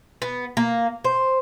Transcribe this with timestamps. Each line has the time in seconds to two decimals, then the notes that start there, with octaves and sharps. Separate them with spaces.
0.22 B3
0.57 A#3
1.04 C5